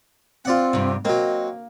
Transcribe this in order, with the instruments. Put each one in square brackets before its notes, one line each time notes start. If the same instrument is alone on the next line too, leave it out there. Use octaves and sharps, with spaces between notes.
[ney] C4 [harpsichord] F4 D5 F#5
[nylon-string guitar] G2 C3
[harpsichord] F#3 C4 [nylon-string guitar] A#3 [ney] D#5